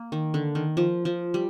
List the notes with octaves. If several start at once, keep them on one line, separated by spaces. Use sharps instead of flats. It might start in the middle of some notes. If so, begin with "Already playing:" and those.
Already playing: A#3
D#3
D3
D#3
F3
F3
G3